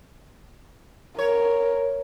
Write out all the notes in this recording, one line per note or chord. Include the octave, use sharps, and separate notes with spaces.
A#4 C#5